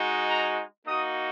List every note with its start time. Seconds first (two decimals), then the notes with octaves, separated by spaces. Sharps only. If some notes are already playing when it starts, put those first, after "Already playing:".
Already playing: G#3 D#4 F#4
0.30 A#5
0.85 A#3 D#4 F#4 D#6